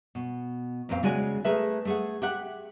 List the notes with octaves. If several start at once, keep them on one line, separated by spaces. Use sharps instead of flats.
B2
F2 A#2 C4 A4 F5
C#3 G#3 E4 F#4 D5 G#5
A3 G#4 A#4 B4 E5
A3 G#4 F#5
G4 E5 F#5